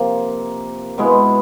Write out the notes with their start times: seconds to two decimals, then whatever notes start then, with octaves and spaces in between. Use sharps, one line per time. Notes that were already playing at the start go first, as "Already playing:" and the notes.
Already playing: C3 F3 A#3
0.98 B2 G#3 B3 E4